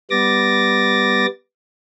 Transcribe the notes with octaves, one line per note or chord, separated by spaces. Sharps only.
G3 B3 D6 A6 A#6